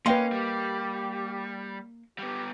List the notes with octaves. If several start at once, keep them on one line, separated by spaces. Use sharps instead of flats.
A#3 C#4 B4 D#5 G5 C6
G3 G4
G3 B3 G4